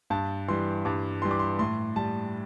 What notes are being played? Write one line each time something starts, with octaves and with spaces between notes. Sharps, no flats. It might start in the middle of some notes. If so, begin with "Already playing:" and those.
G2 A5
E3 G3 C6
G2 D6
E3 G3 C6
D6
C6
A2 C6
G3 A5